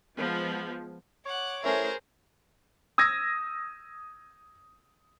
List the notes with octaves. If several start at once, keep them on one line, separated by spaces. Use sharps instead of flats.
F3 G#3 B3
C#5 F#5 D6
A3 C#4 E4 G#4 A#4 C5
D#6 E6 G#6 A#6